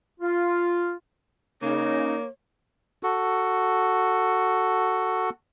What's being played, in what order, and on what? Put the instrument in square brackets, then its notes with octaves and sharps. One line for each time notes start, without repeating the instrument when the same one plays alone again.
[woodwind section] F4
[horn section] C#3 [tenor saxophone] A#3 [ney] D#4 [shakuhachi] C#5
[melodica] F#4 A4